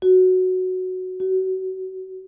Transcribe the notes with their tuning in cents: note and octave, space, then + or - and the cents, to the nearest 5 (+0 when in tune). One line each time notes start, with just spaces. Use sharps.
F#4 +0
F#4 +30